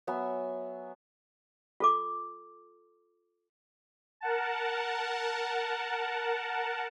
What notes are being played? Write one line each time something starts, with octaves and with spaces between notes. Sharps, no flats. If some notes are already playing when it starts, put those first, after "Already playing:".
F#3 B3 E5 G#5
F4 A4 D6
A#4 F#5 A5